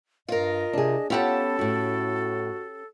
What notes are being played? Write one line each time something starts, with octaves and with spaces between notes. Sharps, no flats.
G2 F4 A#4 D#5
C3 D4 G#4
B3 C#4 F4 G4 A4 F#5 A5
A2 E4 F#4